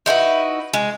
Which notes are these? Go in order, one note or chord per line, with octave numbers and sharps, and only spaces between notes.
D#4 E4 F#4 B4
G#3